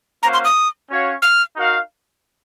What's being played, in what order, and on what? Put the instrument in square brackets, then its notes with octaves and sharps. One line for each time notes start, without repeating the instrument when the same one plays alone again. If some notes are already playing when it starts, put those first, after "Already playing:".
[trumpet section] A#3 C#4 F#4 C5 F5 [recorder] A#5
[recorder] C6
D#6
[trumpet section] C#4 F#4 C#5 F5
[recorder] F6
[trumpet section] D#4 F#4 A#4 F5